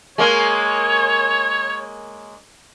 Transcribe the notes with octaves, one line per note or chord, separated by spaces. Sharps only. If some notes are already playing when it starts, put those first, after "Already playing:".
G#3 A#3 C#4 C#5